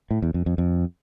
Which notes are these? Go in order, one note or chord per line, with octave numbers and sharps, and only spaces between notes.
A2
E2
F2
F2
F2